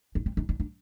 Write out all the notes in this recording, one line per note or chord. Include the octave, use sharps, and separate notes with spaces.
D4
C4
D4
D4
D4